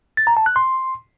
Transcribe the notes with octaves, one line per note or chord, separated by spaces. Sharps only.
A6
A#5
A5
F#6
C6